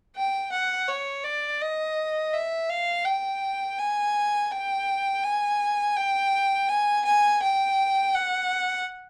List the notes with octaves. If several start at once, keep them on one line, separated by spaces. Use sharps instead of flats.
G5
F#5
C#5
D5
D#5
E5
F5
G5
G#5
G5
G#5
G5
G#5
G#5
G5
F#5